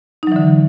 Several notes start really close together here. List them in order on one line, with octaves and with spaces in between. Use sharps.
D#4 F#3 E3 D3